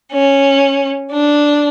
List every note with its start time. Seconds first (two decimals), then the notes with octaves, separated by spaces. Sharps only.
0.12 C#4
1.12 D4